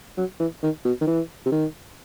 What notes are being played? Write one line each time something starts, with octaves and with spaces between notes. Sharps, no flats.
F#3
E3
D#3
B2
D#3
E3
C3
D#3